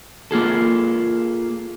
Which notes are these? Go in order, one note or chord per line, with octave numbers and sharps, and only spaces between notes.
A#3 F4 G#4 A4